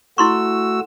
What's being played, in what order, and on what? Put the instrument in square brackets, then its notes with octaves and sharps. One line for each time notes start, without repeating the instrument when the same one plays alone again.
[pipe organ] A3 F#4 E6 [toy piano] E4 C6 C#6